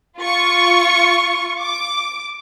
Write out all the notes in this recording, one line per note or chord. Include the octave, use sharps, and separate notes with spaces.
F4 C#6
D6